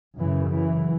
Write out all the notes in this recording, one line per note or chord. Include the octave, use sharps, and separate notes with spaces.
F#2 C#3 E3
E3